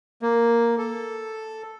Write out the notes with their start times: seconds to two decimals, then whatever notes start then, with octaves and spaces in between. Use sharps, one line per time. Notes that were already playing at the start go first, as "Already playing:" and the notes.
0.22 A#3
0.78 A4